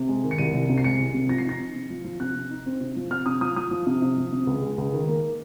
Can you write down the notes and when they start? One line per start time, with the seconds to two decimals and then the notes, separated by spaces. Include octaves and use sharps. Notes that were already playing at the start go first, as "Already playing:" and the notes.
Already playing: C3
0.09 G#3
0.24 D#3
0.31 C#7
0.38 C2 D#7
0.53 C2
0.69 C3
0.78 C7
0.84 G#3 C#7
0.99 C2
1.14 C3
1.29 F3 A#6
1.38 C7
1.45 D#4 A#6
1.60 C3
1.75 C3
1.90 F3
2.04 F3
2.20 C3 F#6
2.36 C3
2.51 D#4
2.66 C4
2.81 C3
2.96 F3
3.11 C3 F6
3.26 C3 D#6
3.41 F3 D#6
3.56 F3 D#6
3.71 F3
3.87 C3
4.02 C3
4.17 F3
4.32 C3
4.47 C#2
4.62 G#3
4.78 C#2
4.93 D#3
5.08 A#3